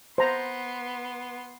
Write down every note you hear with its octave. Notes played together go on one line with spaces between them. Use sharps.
B3 C5 A#5 C6